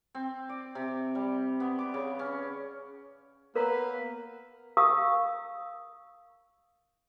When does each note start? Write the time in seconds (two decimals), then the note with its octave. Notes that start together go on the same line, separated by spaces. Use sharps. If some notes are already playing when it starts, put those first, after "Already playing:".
0.15 C4
0.49 D5
0.75 C3
1.15 G3
1.60 B3
1.79 D6
1.94 C#3
2.19 C#4
3.55 A#3 B3 A#4 B4 C#5 A#5
4.77 A#4 F5 C#6 D#6 E6